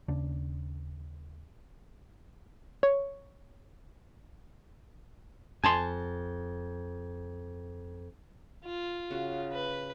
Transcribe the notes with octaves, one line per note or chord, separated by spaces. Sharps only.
D#2 C#3 D4
C#5
F2 G#5 A5 C6
F4
C#3 F#4
B4